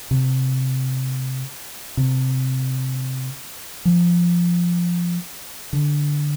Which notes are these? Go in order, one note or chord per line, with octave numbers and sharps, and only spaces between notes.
C3
C3
F3
D3